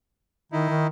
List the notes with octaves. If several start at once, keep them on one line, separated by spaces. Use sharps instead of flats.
D#3 D#4 E4
D#3